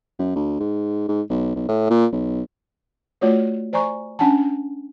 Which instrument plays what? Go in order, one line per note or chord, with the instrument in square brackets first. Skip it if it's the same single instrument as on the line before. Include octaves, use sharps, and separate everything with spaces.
[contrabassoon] F#2
D2
G#2
G#2
B1
B1
A2
A#2
B1
[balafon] A3 F4 F#4 C#5 D5
C5 D5 G#5 A#5 C#6
C#4 D4 F#5 G#5 A5